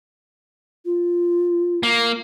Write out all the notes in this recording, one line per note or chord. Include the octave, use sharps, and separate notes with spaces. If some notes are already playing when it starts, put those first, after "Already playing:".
F4
A#3